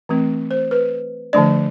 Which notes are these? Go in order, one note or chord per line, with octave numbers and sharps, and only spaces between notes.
E3 A3 C4
C5
B4
D3 F3 A3 D4 D5